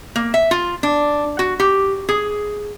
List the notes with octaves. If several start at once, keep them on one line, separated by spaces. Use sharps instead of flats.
A#3
E5
F4
D4
F#4
G4
G#4